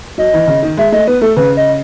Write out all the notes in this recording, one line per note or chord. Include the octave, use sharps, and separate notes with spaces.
F#3 D#5
E3
C#3
D#3
G#3 E5
A3 D#5
B3 B4
A3 A4
C#3 B4
D#5